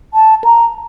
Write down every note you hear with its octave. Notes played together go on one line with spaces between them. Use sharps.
A5
A#5